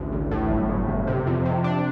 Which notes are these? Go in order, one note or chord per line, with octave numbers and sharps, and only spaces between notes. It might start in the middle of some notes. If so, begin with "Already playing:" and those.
Already playing: A1 D2
A1
A2
G1
G1
G1
C3
F2
C3
D4